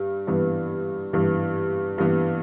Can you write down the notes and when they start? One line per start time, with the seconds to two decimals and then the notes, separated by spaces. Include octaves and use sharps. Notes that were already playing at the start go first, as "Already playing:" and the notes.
Already playing: G2
0.27 G2 E3 B3
1.13 G2 E3 B3
1.98 G2 E3 B3